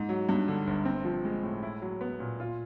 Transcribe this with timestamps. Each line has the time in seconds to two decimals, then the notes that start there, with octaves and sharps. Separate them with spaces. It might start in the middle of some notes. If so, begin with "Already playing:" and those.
Already playing: G#2
0.09 F#3
0.29 G2
0.48 D3
0.67 G1
0.85 C4
1.05 F3
1.25 G#3
1.43 A2
1.63 E4
1.82 F#3
2.01 B3
2.20 A#2
2.40 F4